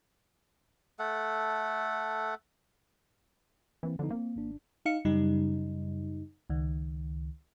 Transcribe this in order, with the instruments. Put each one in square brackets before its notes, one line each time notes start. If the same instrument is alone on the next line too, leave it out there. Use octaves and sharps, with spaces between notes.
[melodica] A3 A4 F#5
[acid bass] E3 [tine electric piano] A#3 C4
[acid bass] D3 [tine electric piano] F3 B3 D#4
[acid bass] A#3 [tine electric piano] C4
[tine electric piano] G#1 D4
[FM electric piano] D#4 F5 C#7
F#2 C#3 G3 D#4
C#2 D#3